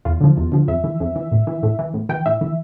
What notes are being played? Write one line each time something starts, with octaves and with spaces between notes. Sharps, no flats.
E2 F4
D3 F3
E2
D3 F3
F2 E5
E3
F2
E3
A2
E3
A2
E3
A2
E3 G5
A2 E5
E3